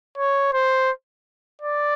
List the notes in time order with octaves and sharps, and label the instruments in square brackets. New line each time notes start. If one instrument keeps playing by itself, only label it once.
[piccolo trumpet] C#5
C5
D5